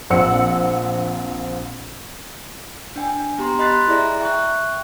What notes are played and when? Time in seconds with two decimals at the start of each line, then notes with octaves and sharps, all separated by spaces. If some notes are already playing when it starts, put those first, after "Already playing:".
0.10 A#1 C4 F#5 E6 C#7
2.96 D4 G5 G#5
3.38 B3 G4 A#5 C6
3.59 D#5 B5 C6 F#6 A6
3.88 E4 G#4 D5 E5 A#5
4.20 E5 G5 C#6 F#6